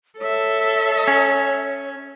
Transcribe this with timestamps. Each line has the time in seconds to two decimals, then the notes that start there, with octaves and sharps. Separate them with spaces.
0.19 A4 C#5 E5
1.08 C#4